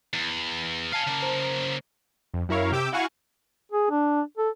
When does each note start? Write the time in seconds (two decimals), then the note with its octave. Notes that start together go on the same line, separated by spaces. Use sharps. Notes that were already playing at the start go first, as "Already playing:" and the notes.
0.14 E2
0.92 F5 G#5 A5 F6
1.07 C#3 A#3
1.21 C5 A#5
2.34 F2
2.49 F#2 E4 A#4 C#5 F5
2.72 C3 G4 D6 E6 G6
2.92 E4 F#4 F5 F#5 G#5 C#6
3.72 G#4
3.91 D4
4.37 A4